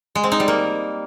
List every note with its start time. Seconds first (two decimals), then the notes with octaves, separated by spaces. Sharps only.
0.15 G#3
0.24 C4
0.32 D#4
0.40 G3
0.48 A#3